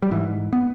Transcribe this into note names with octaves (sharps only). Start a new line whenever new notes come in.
G3
G#2 E3
B3